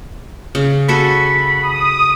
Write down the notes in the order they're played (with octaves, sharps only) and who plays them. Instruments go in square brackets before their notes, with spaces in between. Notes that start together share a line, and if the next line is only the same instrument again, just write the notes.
[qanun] C#3
[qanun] F#4 A4 G#5 [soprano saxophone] B5
[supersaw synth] D#6